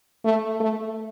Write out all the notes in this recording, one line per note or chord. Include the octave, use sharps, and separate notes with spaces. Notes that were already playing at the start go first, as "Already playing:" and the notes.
A3
A3